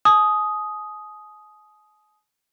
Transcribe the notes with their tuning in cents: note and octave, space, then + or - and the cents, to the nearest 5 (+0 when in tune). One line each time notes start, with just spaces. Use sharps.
G#5 +40 D#6 +5